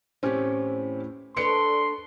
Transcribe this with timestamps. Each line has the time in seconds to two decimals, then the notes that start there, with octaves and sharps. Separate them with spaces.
0.23 A2 E3 C4 C#4 G4
1.37 D4 A4 B4 C#5 C6 C#7